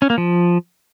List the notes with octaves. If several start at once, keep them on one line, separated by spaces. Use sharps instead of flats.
C#4
A#3
F3